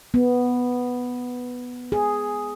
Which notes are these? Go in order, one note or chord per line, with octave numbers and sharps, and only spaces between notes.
B3
G#4